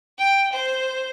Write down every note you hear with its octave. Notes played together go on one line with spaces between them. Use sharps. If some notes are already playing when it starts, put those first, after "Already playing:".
G5
C5